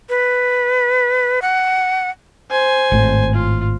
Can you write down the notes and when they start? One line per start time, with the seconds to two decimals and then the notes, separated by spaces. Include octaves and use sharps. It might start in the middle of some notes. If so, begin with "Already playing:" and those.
0.09 B4
1.42 F#5
2.51 C5 G#5
2.92 G#1 A2
3.34 F4